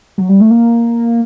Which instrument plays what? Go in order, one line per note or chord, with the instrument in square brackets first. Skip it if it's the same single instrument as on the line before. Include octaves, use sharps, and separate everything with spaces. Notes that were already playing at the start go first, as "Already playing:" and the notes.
[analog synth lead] F#3
G3
A3
A#3